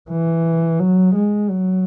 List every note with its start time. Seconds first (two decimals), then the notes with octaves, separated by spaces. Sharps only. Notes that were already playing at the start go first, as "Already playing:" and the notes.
0.10 E3
0.80 F#3
1.15 G#3
1.50 F#3